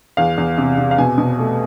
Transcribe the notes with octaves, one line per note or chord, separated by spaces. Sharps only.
E2 F5
E2
C3
C3
F5
B2 G#5
B2
A3